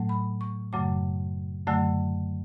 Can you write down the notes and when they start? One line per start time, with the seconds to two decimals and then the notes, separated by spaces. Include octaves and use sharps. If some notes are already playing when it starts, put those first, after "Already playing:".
Already playing: A2 F#3 A3
0.09 B5
0.41 C#6
0.73 F#2 C#3 F#3 A3 D6
1.67 F#2 D3 F#3 A3 E6